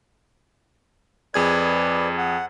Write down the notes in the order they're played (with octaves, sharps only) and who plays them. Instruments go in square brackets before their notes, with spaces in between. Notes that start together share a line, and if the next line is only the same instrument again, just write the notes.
[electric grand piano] F2 G#4 G#6 [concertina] B4 D5
[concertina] F#5